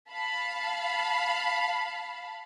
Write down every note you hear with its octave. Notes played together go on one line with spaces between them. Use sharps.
F5 A5 B5